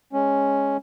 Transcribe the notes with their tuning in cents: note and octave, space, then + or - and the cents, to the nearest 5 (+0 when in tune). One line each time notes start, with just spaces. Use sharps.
G#3 +0 C#4 +0